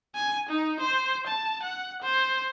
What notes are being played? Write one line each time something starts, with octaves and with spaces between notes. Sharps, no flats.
G#5
D#4
C5
A5
F#5
C5